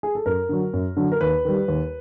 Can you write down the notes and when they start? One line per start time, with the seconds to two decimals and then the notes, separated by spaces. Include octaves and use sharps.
0.03 G#4
0.15 A4
0.26 F#2 A#4
0.49 D3 F#3
0.73 F#2
0.97 D3 F#3
1.12 A#4
1.21 D#2 B4
1.45 D#3 G3
1.68 D#2